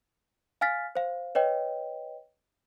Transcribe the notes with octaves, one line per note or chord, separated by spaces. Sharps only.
F5 G#5 F6 A6 B6
C5 F5
B4 C#5 D#5 G5